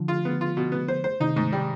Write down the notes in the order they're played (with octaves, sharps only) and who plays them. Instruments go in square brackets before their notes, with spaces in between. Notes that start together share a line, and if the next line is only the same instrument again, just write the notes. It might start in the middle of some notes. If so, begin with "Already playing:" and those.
Already playing: [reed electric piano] D3 F3
[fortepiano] F4
B3
F4
B2
B3
C5
C5
[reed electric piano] C3 D#3 [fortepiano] D#4
[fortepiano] G#2
G3